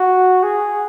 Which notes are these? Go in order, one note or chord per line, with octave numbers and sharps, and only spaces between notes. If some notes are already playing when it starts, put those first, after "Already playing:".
Already playing: F#4
G#4